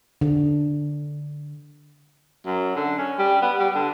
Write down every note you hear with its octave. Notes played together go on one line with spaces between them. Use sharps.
D3
F#2
D3
C#4
G3
B3
G3
D3